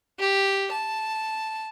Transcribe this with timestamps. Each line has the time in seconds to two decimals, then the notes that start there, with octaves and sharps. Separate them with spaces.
0.19 G4
0.72 A5